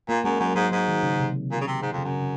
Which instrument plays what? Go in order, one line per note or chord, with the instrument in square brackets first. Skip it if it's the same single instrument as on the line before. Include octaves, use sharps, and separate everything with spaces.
[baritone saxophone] A#2 [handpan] A#3
[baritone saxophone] F#2 [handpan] G#3
[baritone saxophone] F#2 [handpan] F#3
[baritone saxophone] G#2 [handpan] F#3
[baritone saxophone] G#2 [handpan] F#3
[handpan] D#3
C#3
C3
[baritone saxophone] A#2
C#3
C3
G#2
F2
[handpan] C#3
[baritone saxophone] F#2
[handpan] C#3